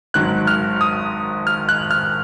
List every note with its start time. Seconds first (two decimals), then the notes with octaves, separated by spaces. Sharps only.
0.14 G#1 G#2 D#3 F#3 F#6
0.47 F6
0.81 D#6
1.47 F6
1.69 F#6
1.91 F6